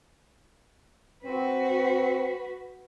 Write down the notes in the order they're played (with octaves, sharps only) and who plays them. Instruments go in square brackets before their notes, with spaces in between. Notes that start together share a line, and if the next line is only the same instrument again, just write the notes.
[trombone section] C4 [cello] F#4 B4